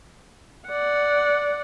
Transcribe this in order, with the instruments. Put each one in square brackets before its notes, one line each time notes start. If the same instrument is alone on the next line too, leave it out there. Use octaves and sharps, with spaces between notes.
[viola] D5 F#5